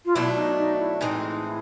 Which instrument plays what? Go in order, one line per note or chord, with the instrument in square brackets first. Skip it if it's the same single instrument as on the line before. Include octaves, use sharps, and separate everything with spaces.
[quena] F4
[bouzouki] B2 F#3 A3 D4 [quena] E4
[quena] D#4
D#4
E4
[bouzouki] A2 E3 G#3 C4 [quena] D#4
[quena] E4